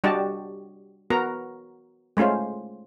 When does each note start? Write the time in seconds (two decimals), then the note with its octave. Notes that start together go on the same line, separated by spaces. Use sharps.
0.04 G3 D4 F#4 G4 D#5 A5
1.10 B3 F#4 A#4 A#5
2.17 G#3 A3 C#4 F4 C5